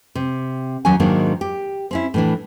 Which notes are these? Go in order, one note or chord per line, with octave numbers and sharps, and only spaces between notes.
C3
D#2 F#3 C#4 F#4 G#5
G#2 D#3 F#3 G#3 A#3 D4
G4
C4 C#4 E4
A2 E3 D4